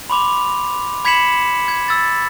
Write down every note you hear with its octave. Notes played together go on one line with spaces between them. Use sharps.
B5 C6 D6 F7
B5 G#6 B6 C#7 E7 F#7
G#6
E6 A6